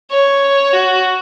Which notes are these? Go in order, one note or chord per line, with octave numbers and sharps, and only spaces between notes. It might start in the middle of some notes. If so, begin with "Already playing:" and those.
C#5
F#4